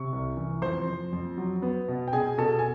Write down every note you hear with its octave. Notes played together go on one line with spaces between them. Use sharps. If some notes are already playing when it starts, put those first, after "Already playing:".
Already playing: C3 C#6
C2
E3
F2 C5 C6
F2
F2
F#3
B3
B2
G5
B2 G#4 G#5
B2 A4 A5
G#5